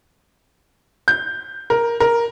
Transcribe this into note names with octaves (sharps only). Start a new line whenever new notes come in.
G6
A#4
A#4